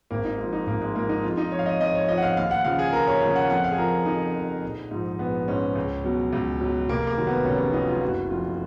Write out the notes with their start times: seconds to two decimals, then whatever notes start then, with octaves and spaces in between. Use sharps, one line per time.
0.11 G#1 A#3
0.25 D#4
0.38 G#2 F3
0.53 D#4
0.66 G#1 A#3
0.82 G#3
0.95 G#2 F3 A#3
1.09 D#4
1.23 F2 F4
1.37 D#4
1.52 F3 C#5
1.59 F5
1.66 D#5
1.81 F2 D#5
1.95 C#5
2.08 F3 D#5
2.18 F#5
2.22 F5
2.36 D#2 F5
2.51 F#5
2.64 C#3 F3 F5
2.79 G#4
2.93 D#2 A#4
3.08 C#5
3.21 C#3 F3 F5
3.36 F#5
3.50 F2 F#5
3.64 F5
3.71 G#4
3.78 F3 A#4
4.06 F2 D#4
4.35 F3
4.62 A#1
4.91 G#2 F3
5.19 A#1 B3
5.48 G#2 F3 C#4
5.75 C#2
6.04 B2 F#3
6.33 C#2
6.61 B2 F#3
6.88 F1 A#3
7.07 A#3
7.17 D#2 D#3 F#3
7.27 B3
7.45 F1 C#4
7.59 C#4
7.73 D#2 D#3 F#3 D#4
7.87 F4
8.02 F#1 F#4
8.30 F2 F3 F4